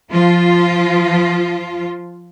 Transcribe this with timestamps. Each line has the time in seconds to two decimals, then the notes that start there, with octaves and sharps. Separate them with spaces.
0.10 F3 F4